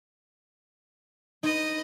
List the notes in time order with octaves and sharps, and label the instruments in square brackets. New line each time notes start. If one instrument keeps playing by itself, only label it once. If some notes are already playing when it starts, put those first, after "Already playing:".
[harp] D#4 [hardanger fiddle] B4 D#5